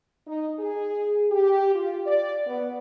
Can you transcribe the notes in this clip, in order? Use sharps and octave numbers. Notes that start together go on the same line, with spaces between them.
D#4
G#4
G4
F4
D5
B3